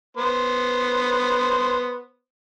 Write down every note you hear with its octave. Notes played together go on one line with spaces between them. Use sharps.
B3 C5